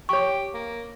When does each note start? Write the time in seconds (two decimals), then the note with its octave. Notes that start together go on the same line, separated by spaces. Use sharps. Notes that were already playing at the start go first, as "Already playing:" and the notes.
0.09 G4 C#5 C#6
0.54 A#3